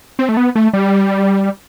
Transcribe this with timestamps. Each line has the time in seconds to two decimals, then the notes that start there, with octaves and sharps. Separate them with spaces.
0.19 C4
0.29 A3
0.37 B3
0.55 A3
0.73 G3